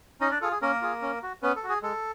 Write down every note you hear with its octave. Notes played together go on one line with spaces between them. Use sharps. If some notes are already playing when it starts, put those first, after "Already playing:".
C#4 D#4 D#5
D4 D5
F4 G#4 A4
G#4
A#3 C#4 A#4
F4 G#4
C#4
F#4
B3 C#4 B4
A4
F#4
G#4
G#3 A4